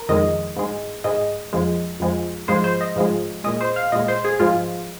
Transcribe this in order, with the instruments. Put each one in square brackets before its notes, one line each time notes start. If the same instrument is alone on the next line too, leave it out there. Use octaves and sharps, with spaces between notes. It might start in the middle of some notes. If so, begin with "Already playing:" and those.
Already playing: [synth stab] A#4
F2 D#3 G#3 D#5
G#2 G#3
G#2 G#3 D#5
F2 F3 G#3
F2 F3 G#3
G#2 F3 G#3 C5
C5
D#5
G#2 F3 G#3
A#2 G#3 D#5
C5
F5
A#2 G#3 D#5
C5
G#4
G#2 F3 G#3 F4